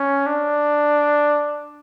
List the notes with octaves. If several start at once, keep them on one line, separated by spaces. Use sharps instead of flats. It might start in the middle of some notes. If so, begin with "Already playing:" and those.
Already playing: C#4
D4